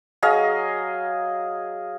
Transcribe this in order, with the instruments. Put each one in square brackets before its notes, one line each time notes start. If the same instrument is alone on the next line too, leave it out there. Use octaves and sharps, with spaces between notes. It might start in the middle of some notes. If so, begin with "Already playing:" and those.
[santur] F#3 G#4 D#5 F5